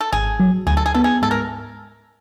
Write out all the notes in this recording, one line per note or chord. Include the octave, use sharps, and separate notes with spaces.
A4
G#1 G#4
F#3
D2 G#4
A4
G#4
B3 A4
G#4
G#2 A4
A#4